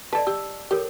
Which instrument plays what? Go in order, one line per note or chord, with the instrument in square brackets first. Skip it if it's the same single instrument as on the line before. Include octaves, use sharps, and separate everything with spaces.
[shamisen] A4 B4 [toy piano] D5 D#5 A5
[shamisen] G4 [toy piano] E6
[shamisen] G4 [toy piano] A4 A#4 C#5